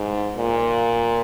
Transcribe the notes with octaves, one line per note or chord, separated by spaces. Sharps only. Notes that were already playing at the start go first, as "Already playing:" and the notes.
Already playing: G#2
A#2